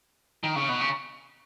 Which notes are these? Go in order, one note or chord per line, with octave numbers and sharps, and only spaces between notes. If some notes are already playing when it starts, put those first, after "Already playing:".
D#3
C#3
B2
C#3